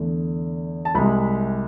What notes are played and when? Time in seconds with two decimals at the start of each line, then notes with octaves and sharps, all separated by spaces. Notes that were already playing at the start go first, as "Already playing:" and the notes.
Already playing: E2 D3 A3
0.85 A5
0.95 C2 C3 G#3 B5